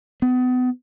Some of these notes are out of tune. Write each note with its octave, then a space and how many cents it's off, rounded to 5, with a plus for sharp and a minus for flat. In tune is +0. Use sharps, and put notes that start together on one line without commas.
B3 +35